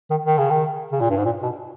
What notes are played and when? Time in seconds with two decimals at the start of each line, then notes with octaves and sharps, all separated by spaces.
0.10 D#3
0.26 D#3
0.38 C#3
0.50 D#3
0.92 C#3
1.00 A#2
1.10 G2
1.17 G#2
1.25 A#2
1.43 B2